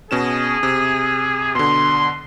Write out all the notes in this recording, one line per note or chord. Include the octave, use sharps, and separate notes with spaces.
B2 C#4 G#4 E7
C3
B2 D3 C6